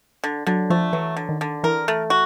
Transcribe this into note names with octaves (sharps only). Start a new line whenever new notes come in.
D3
D3 F#3
F3 A3
E3 F#3
D3
D#3
D3
E3 A#4
A3
F#4